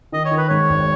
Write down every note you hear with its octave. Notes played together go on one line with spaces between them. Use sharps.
D#3 D#5
C#5
D#3
B4
G#2 C#5
G#1